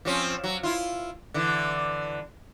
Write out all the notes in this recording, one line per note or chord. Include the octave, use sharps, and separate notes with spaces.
F3 C4 C#4
F#3
E4 F4
D3 E3